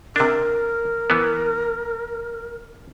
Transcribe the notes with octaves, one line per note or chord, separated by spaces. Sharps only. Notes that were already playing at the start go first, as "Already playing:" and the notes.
C3 D4 A#4
E3 B3